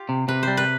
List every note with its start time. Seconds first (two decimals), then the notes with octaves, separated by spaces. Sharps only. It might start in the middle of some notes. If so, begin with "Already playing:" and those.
Already playing: F4 G4
0.09 C3
0.28 C3 B4
0.43 G3 C5
0.57 B4